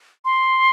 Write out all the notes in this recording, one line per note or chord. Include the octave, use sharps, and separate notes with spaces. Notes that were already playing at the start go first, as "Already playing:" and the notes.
C6